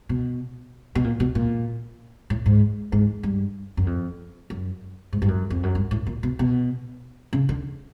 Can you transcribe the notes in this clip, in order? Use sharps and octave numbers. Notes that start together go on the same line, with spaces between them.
B2
B2
A#2
B2
A#2
A2
G#2
G#2
G2
F#2
F2
F#2
G#2
G2
F#2
F2
F#2
G2
A2
A#2
B2
B2
C#3
D3